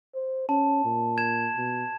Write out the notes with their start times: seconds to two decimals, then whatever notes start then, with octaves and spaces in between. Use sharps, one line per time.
0.15 C5
0.49 C#4 A5
0.84 A#2
1.18 G#6 E7
1.57 B2